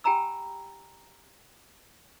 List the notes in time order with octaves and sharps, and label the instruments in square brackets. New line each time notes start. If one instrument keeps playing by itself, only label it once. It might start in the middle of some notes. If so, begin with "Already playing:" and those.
[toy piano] G4 G5 G#5 A#5 B5 E6